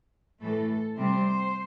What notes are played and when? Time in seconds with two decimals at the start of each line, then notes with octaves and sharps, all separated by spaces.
0.41 A2 E3 A3 A4
0.97 C3 G3 C4 C5